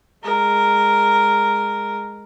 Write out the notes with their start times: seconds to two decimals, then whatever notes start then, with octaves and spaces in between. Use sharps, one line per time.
0.23 G#3 A#4